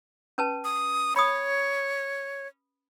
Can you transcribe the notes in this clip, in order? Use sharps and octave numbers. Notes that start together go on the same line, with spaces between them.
C#4 B4 A5
D#6
C#5 B5 D#6